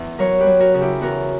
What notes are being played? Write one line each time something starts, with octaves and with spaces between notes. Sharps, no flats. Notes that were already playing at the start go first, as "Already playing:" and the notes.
Already playing: E2
F#3 A#4 C#5
G4 B4
F#3
F#4 A#4
C#3
E4 G4
E2 F#4 A#4